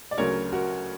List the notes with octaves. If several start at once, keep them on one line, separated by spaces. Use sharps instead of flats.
D5
D2 C#3 F#3 A#4 C#5
F#4 A#4